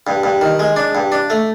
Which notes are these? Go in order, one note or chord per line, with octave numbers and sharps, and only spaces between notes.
G2
G2
D#3
G#3
D4
G2
D4
A3